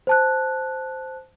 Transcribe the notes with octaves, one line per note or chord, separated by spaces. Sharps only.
C5 A5 F#6